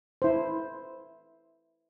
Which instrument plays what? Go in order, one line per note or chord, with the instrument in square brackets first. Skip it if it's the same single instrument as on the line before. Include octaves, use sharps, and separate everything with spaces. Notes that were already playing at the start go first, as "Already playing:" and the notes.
[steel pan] E4 C5